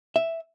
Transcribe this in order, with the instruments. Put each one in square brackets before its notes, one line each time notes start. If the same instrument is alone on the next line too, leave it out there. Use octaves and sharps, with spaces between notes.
[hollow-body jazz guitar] E5